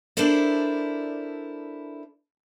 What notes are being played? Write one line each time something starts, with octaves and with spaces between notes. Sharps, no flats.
D4 E4 A4 A#4 C5 D5